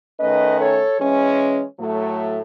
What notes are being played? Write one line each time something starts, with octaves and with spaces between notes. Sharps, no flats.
D#3 A3 C#4 B4 D#5
A4 C#5
E3 G#3 C#4
A2 F#3 A3